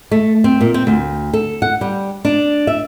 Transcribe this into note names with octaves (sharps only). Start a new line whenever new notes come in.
A3
C4
A#2
C4
D2
A4
F#5
G3
D4
E5